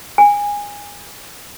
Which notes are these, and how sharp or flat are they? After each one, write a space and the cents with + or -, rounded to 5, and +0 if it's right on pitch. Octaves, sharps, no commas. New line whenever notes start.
G#5 -20